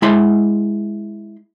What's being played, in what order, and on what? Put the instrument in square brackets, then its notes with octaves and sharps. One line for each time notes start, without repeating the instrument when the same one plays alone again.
[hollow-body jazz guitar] G#3 E4 B5 C6